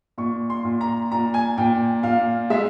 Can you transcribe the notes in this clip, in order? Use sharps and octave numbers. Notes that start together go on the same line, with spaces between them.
A#2 C#6
C6
A#2
A#5
A#2 A#5
G#5
A#2 G5
A#2 F5
G#3 E5